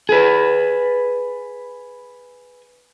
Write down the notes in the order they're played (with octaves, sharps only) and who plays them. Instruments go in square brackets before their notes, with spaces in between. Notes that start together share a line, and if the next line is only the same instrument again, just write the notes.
[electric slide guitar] G#4 B4